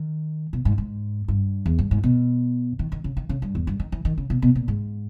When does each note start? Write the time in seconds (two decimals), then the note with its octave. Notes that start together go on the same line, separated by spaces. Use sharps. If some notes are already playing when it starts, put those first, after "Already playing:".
Already playing: D#3
0.53 B2
0.65 G#2
0.78 G#2
1.28 G2
1.66 E2
1.79 G2
1.91 G#2
2.03 B2
2.79 D#3
2.92 D#3
3.04 C#3
3.17 D#3
3.29 C#3
3.42 G2
3.55 E2
3.67 G2
3.80 D#3
3.92 E3
4.05 D#3
4.18 C#3
4.30 B2
4.42 B2
4.55 A#2
4.68 G#2